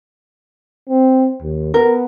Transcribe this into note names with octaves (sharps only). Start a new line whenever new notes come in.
C4
D#2
B3 A#4